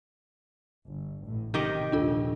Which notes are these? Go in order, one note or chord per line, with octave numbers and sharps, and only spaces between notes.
G1
A1 A2
C3 D#3 G4 D#5
A#1 D#2 A2 D4 F4 A4